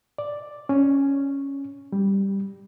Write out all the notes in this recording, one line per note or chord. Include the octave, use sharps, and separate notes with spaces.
D5
C#4
G3